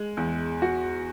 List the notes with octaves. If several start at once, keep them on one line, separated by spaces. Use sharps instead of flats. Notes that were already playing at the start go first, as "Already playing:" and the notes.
Already playing: G#3
E2
F#4